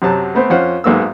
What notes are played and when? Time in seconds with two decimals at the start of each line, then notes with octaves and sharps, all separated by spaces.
0.02 F#2 C3 F#3 A5
0.35 A3 B3 C4 C5
0.50 F2 C#4 F4 C5 F#5
0.84 B1 G#2 A#3 E6